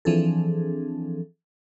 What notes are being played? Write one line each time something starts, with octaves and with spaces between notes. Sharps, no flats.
E3 F3 C4 D4 G#4 A4